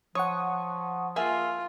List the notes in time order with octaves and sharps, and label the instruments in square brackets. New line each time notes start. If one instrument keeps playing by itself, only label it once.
[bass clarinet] F3 [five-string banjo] C#5 [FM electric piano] F#5 C#6 D#6
[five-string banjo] A#3 G#4 E5 [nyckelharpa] F4